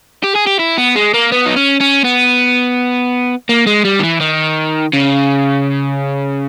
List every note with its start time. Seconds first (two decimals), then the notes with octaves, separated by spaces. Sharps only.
0.24 G4
0.35 G#4
0.47 G4
0.59 E4
0.78 B3
0.96 G#3
1.14 A#3
1.32 B3
1.46 D#4
1.56 C#4
1.80 C#4
2.04 B3
3.49 A#3
3.67 G#3
3.85 G3
3.99 D#3
4.03 E3
4.20 D#3
4.93 C#3